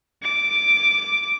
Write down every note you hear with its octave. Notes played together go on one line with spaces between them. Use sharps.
D6